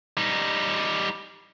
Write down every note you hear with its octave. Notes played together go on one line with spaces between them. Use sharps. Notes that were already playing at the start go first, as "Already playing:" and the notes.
G3 D#4